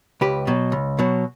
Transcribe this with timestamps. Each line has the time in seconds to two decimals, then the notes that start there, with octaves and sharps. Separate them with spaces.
0.21 C#2 G4 B4
0.47 B2 F#3
0.72 C#2
0.99 B2 F#3